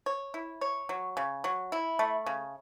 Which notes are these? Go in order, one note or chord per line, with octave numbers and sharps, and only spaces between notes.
C#5
E4
C#5
F#3
C#3
F#3
E4
A3
C#3